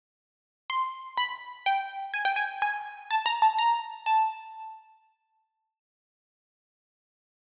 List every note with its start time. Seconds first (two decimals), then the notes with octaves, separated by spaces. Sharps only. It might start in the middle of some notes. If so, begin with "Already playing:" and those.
0.70 C6
1.17 B5
1.66 G5
2.14 G#5
2.25 G5
2.36 G#5
2.62 G#5
3.11 A5
3.26 A#5
3.42 A5
3.59 A#5
4.06 A5